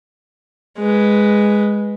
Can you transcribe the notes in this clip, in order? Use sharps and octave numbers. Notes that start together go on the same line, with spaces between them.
G#3 B4